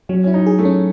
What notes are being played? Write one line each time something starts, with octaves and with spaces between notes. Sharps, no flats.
F#3 C#4
C#4 E4
D#4
G#4
A3
C#4